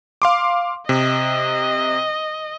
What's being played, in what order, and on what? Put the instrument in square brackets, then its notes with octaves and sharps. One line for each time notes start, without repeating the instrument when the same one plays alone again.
[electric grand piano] F5 C6 D6
[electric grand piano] C3 [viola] D#5